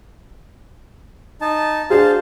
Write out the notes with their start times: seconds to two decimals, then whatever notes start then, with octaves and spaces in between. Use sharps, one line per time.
1.41 D#4 A5
1.90 D4 F#4 G#4 C5 F5 A5